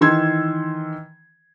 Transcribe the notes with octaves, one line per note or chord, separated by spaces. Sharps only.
D#3 E3 C6 E6 G#6